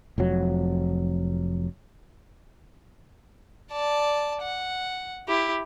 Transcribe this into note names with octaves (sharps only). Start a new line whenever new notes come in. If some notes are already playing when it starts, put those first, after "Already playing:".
F1 F2 F#3
D5 A5
F#5
E4 G4